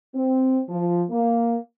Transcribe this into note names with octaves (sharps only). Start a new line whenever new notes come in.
C4
F3
A#3